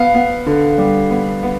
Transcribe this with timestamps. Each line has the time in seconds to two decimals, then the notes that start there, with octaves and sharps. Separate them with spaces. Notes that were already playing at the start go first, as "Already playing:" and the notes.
Already playing: B3 F5
0.15 B3
0.46 D3
0.78 G3
1.10 B3
1.43 B3